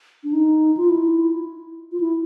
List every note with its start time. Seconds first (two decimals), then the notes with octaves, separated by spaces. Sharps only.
0.24 D4
0.33 D#4
0.77 F4
0.89 E4
1.92 F4
2.00 E4